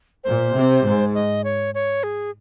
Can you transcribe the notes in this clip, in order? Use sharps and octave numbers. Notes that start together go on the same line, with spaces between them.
A#2 C5
C3
G#2
D#5
C#5
C#5
G#4